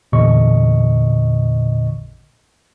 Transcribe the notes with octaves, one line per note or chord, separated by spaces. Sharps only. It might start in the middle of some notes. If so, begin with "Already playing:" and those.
A1 E2 A#2 D3 D#5 C#6